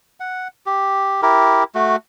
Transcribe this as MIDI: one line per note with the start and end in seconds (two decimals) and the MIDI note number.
0.20 0.48 78
0.66 1.22 67
1.22 1.64 64
1.22 1.64 67
1.22 1.64 70
1.75 1.96 57
1.75 1.96 66